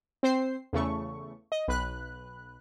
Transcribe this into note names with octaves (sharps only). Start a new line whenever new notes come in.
C4 C5 C7
E2 C#3 A3 C#6
D#5
B1 B4 F#6